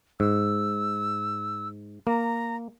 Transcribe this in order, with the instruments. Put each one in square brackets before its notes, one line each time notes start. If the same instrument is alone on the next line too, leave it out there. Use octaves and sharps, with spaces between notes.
[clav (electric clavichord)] G#2 [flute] E6
[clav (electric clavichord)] A#3 [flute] A#5